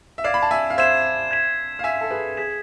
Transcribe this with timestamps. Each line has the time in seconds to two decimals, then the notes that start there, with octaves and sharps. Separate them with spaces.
0.18 E5
0.24 D5 F5 G#6 C7 E7
0.34 B5
0.42 A5
0.51 E5 G#5
0.70 F5
0.78 C5 E5 G#6 C7 E7
1.31 G#6 B6 E7
1.79 F5
1.84 E5 G#5 G#6 B6 E7
2.01 A4
2.11 G#4 B4
2.37 G#4 G#6 B6 E7